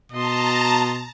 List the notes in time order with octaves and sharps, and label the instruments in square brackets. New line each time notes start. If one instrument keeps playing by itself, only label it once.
[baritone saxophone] B2 [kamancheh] D#5 C6 [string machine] A5 A#5